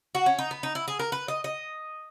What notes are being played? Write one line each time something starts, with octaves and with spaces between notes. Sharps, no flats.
F#4
C#4
D#4
B3
D#4
E4
G#4
A#4
B4
D#5
D#5